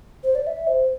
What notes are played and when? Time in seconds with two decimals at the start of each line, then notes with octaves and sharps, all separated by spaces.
0.24 C5
0.35 D5
0.47 E5
0.67 C5